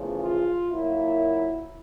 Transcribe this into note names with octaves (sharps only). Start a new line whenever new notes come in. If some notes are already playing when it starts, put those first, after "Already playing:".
Already playing: E2 C#3 F3 A3
F4
A#2 F#3 A#3 E4